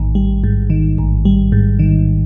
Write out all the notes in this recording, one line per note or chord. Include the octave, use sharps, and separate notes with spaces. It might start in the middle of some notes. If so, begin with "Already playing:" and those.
Already playing: A1 G#2 D#3
G3
G#2
D#3
A1
G3
G#2
D#3